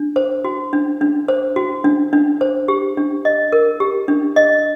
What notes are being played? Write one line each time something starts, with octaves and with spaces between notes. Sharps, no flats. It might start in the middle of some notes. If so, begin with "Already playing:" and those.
Already playing: D4
C5
F#4
D4
D4
C5
F#4
D4
D4
C5
G4
D4
D#5
A#4
G4
D4
D#5